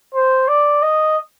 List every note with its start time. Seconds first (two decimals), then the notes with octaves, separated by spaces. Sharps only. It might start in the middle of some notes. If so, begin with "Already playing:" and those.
0.15 C5
0.48 D5
0.82 D#5